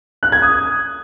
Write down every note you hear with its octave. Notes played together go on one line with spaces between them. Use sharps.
F#6
G#6
D#6